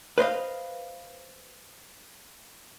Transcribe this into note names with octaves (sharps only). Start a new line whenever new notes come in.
B4 C5 D#5 F5